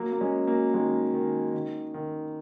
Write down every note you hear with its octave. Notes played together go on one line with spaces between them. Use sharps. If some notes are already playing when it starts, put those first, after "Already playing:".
Already playing: F#3 A#3
A#3
G#3 C#4
F#3 A#3
D#3 G#3
D#3
D#3
D#3